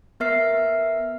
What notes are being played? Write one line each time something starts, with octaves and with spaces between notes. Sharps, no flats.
B3 A#4 E5 F6 C7